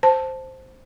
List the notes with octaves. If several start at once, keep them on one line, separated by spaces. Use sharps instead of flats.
C5 A5